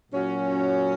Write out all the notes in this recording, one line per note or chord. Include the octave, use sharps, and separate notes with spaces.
A#2 F#3 C#4 F#4